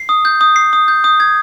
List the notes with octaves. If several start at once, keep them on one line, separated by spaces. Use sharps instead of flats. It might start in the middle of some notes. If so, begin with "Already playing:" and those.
Already playing: C7
D#6
G6
D#6
C7
D#6
G6
D#6
G#6